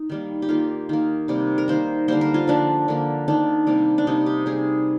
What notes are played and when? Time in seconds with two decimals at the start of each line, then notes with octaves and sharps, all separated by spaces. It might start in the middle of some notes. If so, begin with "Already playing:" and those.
Already playing: D#4
0.10 D#3 G3 A#3
0.42 G4
0.49 D#3 A#3 F4
0.89 D#3 A#3
1.28 C3 G3 A#3
1.58 A#4
1.68 D#3 A#3 C5
2.08 D3 G3 A#3 C5
2.21 A#4
2.34 F4
2.48 D3 F3 A#3 D4
2.88 D3 F3 A#3
3.28 D#3 A#3 D4
3.67 C3 G3 A#3
3.98 D4
4.07 C3 G3 A#3 D#4
4.26 G4
4.46 C3 G3 A#3 G#4